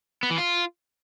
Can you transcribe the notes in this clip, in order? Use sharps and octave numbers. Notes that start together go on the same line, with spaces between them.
B3
E3
F4